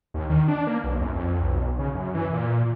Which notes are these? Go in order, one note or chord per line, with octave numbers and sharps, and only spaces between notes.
D#2
D#3
D4
A#3
B1
F#2
F2
B1
C#3
F#2
E3
A#2